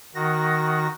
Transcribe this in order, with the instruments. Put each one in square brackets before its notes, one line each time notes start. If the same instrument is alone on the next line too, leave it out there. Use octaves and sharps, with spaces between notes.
[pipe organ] D#3 F#4 A#6